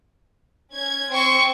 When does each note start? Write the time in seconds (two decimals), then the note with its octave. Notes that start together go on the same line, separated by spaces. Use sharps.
0.73 C#4 G#6
1.13 C4 C5 G5 C#6 C#7